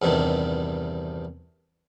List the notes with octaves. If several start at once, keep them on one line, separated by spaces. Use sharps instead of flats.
E2 G2 C3 D#3 D4